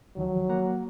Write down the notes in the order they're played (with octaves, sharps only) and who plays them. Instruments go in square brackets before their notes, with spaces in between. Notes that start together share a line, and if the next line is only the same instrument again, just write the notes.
[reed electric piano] D2 D#3 F3 [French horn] F#3
[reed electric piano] A#3 F#5 A#5